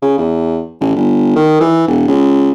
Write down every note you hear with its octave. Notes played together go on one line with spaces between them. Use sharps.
C#3
E2
A1
G1
D#3
E3
E1
C#2